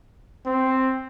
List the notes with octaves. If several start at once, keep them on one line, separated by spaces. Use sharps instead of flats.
C4